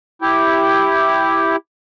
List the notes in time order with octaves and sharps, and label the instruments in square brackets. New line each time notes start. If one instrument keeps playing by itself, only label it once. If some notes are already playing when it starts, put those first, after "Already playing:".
[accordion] E4 G4